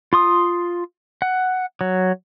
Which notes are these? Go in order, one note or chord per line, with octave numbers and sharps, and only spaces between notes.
F4 C6 D#6
F#5
F#3